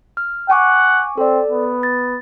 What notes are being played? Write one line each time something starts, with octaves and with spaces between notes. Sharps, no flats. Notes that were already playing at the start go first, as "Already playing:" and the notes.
F6
F#5 G#5 C#6 D6
C4 A4 D5
B3
A6